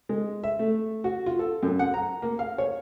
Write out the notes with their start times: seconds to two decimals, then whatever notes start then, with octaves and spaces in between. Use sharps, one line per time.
0.09 G#3
0.44 E5
0.59 A3
1.04 F#4
1.26 F4
1.39 A4
1.63 F#2
1.79 F#5
1.94 A#5
2.22 A#3
2.39 F5
2.58 C#5